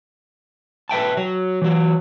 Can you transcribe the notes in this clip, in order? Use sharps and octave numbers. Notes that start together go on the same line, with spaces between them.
B4 E5 G5 A5
F#3
E3 F#3